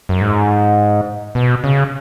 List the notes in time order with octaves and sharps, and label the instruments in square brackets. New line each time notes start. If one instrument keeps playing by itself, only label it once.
[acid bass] F#2
G#2
B2
C#3